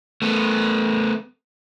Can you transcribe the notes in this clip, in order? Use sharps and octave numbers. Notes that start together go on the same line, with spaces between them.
A3 B3